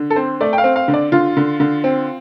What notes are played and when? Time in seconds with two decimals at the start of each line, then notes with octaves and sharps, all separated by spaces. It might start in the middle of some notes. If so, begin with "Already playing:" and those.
Already playing: D3
0.10 A4
0.16 C4 C5
0.41 A3 D5
0.53 G5
0.58 F5
0.64 C4
0.76 F5
0.88 D3
0.94 D5
1.12 D3 F4
1.37 D3
1.60 D3
1.84 C4